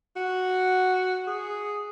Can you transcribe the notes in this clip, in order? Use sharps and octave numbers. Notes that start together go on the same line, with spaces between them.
F#4
G#4